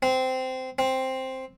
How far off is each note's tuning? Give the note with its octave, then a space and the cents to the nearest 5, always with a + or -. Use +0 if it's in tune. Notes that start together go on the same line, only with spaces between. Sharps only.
C4 -15
C4 +5